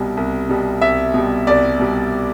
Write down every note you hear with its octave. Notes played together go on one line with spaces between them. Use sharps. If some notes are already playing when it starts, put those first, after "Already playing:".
Already playing: C2 B2 G3
C2
B2 G3
C2 E5
B2 G3
C2 D5
B2 G3